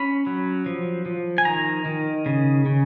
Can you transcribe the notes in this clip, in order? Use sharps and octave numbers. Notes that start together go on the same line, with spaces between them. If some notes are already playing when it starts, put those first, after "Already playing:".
Already playing: C#4 B5
F#3
F3
F3
G#5
D#3 A#5
D#3
C#3
C#3